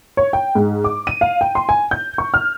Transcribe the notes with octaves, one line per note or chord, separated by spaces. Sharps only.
C#5
G5
G#2
D6
D#7
F5
G5
C6
G#5
G6
C#6
F6